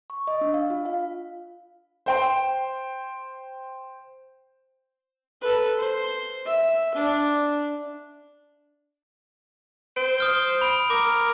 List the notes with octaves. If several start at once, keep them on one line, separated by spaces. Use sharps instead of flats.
C#6
D#5
D4
F5
F4
F5
C5 G5 C6
A4 B4
C5
E5
D4
C5 D7
D#6 F6 G7
B5 D7
A#4 D6